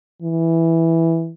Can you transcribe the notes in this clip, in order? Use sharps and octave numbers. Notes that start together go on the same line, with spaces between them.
E3